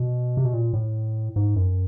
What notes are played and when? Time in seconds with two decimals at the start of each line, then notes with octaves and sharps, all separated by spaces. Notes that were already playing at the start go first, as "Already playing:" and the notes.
Already playing: B2
0.37 C3
0.45 B2
0.53 A#2
0.73 A2
1.36 G#2
1.56 F#2